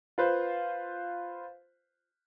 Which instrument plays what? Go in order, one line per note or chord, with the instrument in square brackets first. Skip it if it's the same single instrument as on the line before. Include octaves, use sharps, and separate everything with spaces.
[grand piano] F4 B4 C5